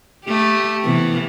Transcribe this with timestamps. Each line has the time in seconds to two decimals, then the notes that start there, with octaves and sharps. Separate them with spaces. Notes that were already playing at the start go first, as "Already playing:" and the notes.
0.25 A3 G4
0.84 C3 E3 B3